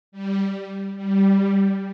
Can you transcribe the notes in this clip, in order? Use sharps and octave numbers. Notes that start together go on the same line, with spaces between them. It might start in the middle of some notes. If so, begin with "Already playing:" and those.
G3
G3